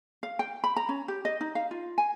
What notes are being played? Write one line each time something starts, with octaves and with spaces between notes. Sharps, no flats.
F5
G5
B5
A#5
C#4
G4
D#5
D#4
F5
F4
G#5